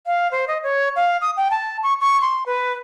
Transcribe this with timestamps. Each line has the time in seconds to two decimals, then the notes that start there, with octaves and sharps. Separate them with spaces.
0.06 F5
0.31 C5
0.48 D#5
0.63 C#5
0.96 F5
1.21 D#6
1.37 G5
1.51 A5
1.83 C#6
2.01 C#6
2.21 C6
2.46 B4